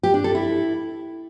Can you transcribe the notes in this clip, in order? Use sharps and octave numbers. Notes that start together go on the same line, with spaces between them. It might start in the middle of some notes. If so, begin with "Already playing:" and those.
G4
D4
A4
E4